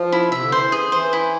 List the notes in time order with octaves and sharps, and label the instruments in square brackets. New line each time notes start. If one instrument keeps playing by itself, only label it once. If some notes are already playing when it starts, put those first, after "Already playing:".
Already playing: [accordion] F3
[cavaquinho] E4
[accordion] C3 [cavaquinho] E5
[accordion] D3
[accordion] E3 [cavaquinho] C5
[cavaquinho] G#4
[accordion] E3 [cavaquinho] C5
[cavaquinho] E4